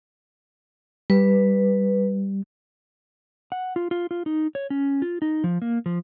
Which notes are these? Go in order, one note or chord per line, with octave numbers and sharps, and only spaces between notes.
G3 B4
F#5
F4
F4
F4
D#4
C#5
C#4
F4
D#4
F3
A#3
F3